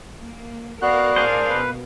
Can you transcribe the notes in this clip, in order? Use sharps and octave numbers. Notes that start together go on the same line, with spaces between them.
A#3
B3 F#4 A#4 D5 F5 F#6
A2 D4 G#4 A#4 C5 F5
B2 B4